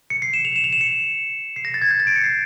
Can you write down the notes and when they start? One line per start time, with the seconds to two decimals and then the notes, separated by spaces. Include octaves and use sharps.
0.10 C#7
0.22 C7
0.34 E7
0.45 F7
0.56 E7
0.64 F7
0.73 E7
0.81 C#7
1.56 C7
1.65 A#6
1.74 A6
1.82 G#6
1.91 G6
2.00 A6
2.07 D7
2.16 C#7
2.24 C7